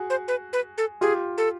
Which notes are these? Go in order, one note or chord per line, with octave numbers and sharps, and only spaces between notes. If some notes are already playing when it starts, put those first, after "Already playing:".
Already playing: F#4 G#4
C5
B4
B4
A4
F4 G4 G#4
A4